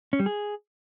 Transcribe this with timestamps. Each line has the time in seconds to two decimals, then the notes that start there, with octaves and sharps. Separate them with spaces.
0.13 C#4
0.20 G3
0.26 G#4